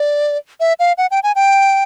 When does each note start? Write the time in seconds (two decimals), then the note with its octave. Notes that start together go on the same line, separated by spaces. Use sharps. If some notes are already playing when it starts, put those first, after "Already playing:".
Already playing: D5
0.60 E5
0.79 F5
0.98 F#5
1.11 G5
1.23 G#5
1.36 G5